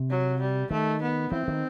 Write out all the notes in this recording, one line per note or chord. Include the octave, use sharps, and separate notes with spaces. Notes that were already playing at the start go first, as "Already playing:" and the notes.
Already playing: C3
F#3
G3
D#3 A3
B3
E3 C4
D#3